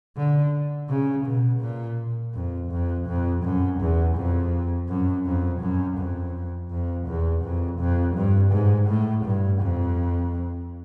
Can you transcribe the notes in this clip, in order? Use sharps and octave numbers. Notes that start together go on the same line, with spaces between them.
D3
C#3
B2
A#2
F2
F2
F2
F#2
E2
F2
F#2
F2
F#2
F2
F2
E2
F2
F2
G2
G#2
A2
G2
F2